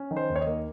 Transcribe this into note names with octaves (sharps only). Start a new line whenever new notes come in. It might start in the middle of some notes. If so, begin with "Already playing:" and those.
Already playing: C#4
D#3
C5
D#2
C#5
D#5
A#3